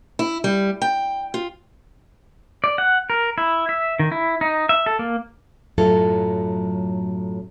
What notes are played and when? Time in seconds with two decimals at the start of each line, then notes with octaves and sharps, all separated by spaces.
0.19 E4
0.44 G3
0.82 G5
1.34 F4
2.64 D5
2.78 F#5
3.10 A#4
3.38 E4
3.69 E5
3.99 D#3
4.12 E4
4.41 D#4
4.69 E5
4.86 A4
4.99 A#3
5.78 F#2 A2 F#3 F4 A4